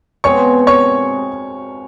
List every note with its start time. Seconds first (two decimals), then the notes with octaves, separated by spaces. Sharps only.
0.24 B2 G#3 C4 C#5 C#6
0.67 C#5 C#6